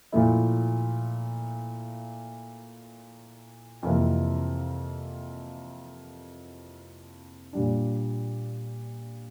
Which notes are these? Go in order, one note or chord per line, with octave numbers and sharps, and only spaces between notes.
A#2 F3 A3 E4
F2 C3 E3 A#3
A#2 G3 D4